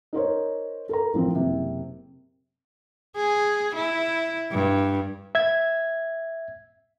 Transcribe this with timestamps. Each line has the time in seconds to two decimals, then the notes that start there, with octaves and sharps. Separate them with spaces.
0.13 D#4 A#4 C5 C#5
0.89 A4 A#4 A#5
1.14 A1 F3 C4
1.35 F#1 C3
3.16 G#4
3.75 E4
4.51 G2
5.35 E5 G#6